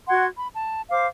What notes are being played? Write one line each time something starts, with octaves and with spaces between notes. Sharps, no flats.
F#4 F#5 C6 G#6
B5
A5
C5 F5 D6